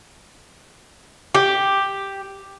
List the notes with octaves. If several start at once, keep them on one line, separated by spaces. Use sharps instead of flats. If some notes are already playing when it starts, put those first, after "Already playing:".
G4